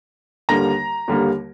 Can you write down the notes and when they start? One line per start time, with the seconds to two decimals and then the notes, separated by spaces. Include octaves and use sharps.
0.49 D#2 D3 G3 A#3 A#5 A#6
1.08 D#2 D3 G3 A#3